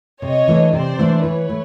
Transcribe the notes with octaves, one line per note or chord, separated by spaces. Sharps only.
C3 C#5 D#5
E3 A3 D4
C3 C5 D5
E3 A3 D4
E3 B4 C#5
A3